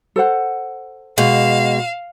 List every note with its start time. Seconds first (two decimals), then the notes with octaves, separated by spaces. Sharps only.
0.16 A4 C5 F#5
1.18 B2 G#3 F5 E7